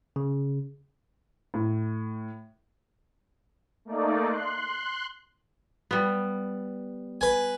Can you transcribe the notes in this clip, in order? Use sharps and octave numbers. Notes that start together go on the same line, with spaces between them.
C#3
A2
A3 A#3 D#4 D5
C6 F#6
G3 B3
B4 G#5